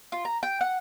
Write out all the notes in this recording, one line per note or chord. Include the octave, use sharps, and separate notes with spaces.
F4
A#5
G5
F#5